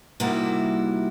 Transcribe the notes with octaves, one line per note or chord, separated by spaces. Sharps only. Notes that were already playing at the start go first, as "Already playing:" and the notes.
C3 G3 A#3 D#4 E4 F#4